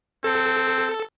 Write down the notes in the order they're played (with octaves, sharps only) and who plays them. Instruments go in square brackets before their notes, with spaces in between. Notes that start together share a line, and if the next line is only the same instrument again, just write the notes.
[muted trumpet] C4 [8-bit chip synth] A4